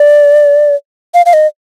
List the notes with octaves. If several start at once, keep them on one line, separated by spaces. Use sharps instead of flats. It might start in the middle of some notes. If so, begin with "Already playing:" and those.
Already playing: D5
F5
F5
D#5